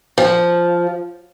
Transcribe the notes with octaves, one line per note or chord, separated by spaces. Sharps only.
F3